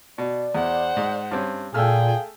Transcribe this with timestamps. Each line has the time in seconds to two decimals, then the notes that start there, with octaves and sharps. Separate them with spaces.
0.18 B2 D5
0.55 E2 C5 F#5
0.97 G#2
1.31 G2 C4 C#4
1.74 A#2 A3 G#4 F5 G5 E6 F6